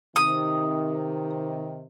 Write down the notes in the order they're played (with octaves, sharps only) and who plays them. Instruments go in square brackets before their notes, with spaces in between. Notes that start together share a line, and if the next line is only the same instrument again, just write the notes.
[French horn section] C3 D#3 [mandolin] D#6